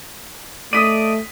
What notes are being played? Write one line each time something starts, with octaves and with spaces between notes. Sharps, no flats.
A3 D5 D#5 D#6 B6 D#7